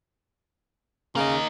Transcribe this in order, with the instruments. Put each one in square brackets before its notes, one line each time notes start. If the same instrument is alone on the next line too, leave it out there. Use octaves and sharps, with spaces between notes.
[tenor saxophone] C#3 [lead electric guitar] A#3 D#4